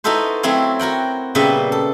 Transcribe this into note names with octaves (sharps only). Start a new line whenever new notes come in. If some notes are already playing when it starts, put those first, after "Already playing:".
D#4 E4 F#4 A4 B4 C5
F#3 A3 C4 E4 C#5 F5
F#4 A#4 F#5 G5
A#2 C#3 G3 B3 B4 E5
A4